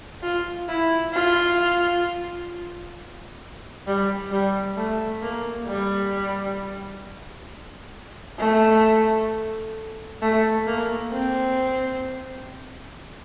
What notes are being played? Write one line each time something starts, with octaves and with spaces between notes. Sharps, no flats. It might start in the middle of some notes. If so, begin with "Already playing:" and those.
F4
E4
F4
G3
G3
A3
A#3
G3
A3
A3
A#3
C4